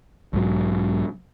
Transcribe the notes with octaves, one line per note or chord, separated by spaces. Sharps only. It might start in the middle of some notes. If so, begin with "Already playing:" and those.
B1 G#2 F#3